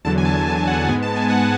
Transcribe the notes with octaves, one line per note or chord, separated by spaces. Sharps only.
E2 D3 F#3 A5
G#5
A5
G#5
F#5
G#2 G#3 B3 G#5
A5
G#5
F#5